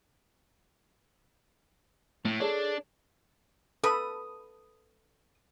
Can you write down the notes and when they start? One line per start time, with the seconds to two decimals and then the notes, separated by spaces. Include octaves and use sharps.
2.25 A2 A3
2.40 D4 G#4 A4 C#5
3.84 A4 B4 B5 D#6